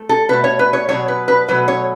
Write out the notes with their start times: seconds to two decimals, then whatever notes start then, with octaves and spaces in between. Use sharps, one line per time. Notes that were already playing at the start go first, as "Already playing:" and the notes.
Already playing: A3
0.09 A4
0.29 B2 A3 B4
0.44 C#5
0.59 B4
0.73 C#5
0.89 B2 F#3 A3 C#5
1.08 B4
1.28 B4
1.48 B2 F#3 A3 B4
1.68 C#5